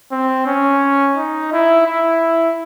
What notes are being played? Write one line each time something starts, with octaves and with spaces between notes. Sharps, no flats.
C4
C#4
D#4
E4
E4